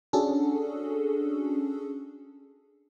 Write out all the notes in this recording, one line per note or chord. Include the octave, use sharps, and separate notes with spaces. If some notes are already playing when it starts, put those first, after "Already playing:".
C#4 D4 F#4 G#4 A4